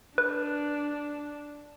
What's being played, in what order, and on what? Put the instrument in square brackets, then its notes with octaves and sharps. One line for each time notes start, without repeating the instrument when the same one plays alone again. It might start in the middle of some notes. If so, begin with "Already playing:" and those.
[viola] D4 [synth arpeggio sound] B4